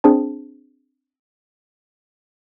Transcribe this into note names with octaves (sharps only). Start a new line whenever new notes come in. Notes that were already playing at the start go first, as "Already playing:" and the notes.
C4 D4 G#4 C5 A5